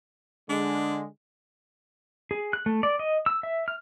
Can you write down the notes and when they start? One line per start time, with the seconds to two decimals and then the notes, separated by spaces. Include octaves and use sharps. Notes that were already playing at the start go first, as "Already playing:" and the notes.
0.49 D3 G#3 D4
2.31 G#4
2.53 F#6
2.66 A3
2.83 D5
2.99 D#5
3.26 E6
3.43 E5
3.68 F6